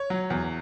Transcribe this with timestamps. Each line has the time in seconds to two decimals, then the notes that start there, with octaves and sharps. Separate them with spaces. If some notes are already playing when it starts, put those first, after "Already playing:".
Already playing: C#5
0.10 F#3
0.30 E2